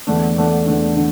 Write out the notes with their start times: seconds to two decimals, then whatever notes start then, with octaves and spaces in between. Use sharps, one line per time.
0.07 E2 D3 A3 D4
0.36 E2 D3 A3 D4
0.66 E2 D3 A3 D4
0.96 D3